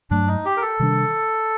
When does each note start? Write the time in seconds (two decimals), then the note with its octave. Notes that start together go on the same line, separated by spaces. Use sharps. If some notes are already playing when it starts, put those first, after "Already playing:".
0.11 G2 F#3 A3 D4
0.28 D#4
0.45 G4
0.57 A#4
0.62 A4
0.80 C3 D#3 G3 D4